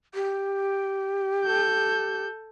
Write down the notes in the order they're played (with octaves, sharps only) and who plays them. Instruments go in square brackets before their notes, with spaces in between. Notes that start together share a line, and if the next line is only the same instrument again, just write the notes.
[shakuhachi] G4
[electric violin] A4 G6